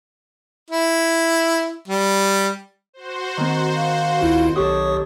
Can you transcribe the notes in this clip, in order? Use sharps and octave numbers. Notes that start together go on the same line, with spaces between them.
E4
G3
F#4 C5
D#3 C4
F5
D2 E4 F4
B1 G4 A4 C#5 C#6 D#6